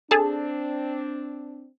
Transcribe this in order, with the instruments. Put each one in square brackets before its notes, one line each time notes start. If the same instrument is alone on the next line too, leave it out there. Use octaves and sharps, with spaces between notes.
[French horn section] C4 D4 [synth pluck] G#4 A4 A5